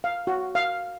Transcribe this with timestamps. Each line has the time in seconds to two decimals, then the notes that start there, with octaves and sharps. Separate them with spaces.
0.04 F5
0.27 F#4
0.55 F5